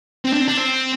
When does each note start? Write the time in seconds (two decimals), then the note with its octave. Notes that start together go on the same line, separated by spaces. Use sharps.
0.25 C4
0.33 D4
0.41 C4
0.48 D4
0.57 C4